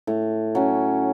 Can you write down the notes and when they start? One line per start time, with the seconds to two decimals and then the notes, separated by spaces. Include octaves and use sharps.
0.07 A2
0.55 F#3 C#4